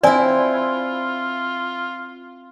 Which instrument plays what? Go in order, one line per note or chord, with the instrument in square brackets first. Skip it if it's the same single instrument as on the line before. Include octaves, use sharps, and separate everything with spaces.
[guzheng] C4 E4 [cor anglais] F4 [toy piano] D5 G#5